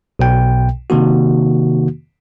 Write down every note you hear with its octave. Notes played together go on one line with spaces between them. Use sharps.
B1 B2 G5
C3 D#3 A#3 F#4